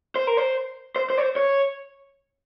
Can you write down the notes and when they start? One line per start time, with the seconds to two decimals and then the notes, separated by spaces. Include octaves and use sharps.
0.16 C5
0.27 A#4
0.37 C5
0.96 C5
1.10 C5
1.18 C#5
1.23 C5
1.36 C#5